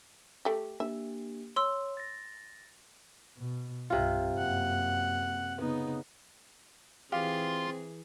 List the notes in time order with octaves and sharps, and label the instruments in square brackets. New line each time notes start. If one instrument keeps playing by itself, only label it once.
[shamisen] A3 G4
[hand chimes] A#3 D4 G4 [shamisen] E5
[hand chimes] C#5 [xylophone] C6 E6
[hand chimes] A6 A#6
[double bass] B2
[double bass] C2 G2 [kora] C3 F4
[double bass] F#2 A#3 [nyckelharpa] F#5
[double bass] C#3 [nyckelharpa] B3 D#4
[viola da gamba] E3 G#4 [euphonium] C4 [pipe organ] F4 C6 [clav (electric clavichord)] G4 F5